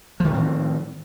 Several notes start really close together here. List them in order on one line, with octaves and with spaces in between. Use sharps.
F3 D#3 A2 C4